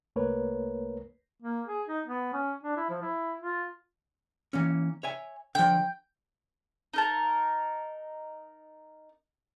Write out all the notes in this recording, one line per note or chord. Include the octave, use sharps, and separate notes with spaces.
C2 A3 A#3 A#4 B4 C#5
A#3
G#4
D#4
B3
C#4
D4
E4
F3
E4
F4
E3 A#3 C#4
C#5 E5 G#5
D3 F3 G5
D#4 A#4 A5